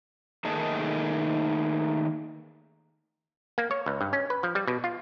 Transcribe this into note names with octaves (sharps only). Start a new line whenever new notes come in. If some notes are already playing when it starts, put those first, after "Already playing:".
D#3 A3 A#3 D#4 G#4 A5
A#3
C#5
C#2
G2
C#4
B4
F3
G3
B2
F4